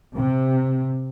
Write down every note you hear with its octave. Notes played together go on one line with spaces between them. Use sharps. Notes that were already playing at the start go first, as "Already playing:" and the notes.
C3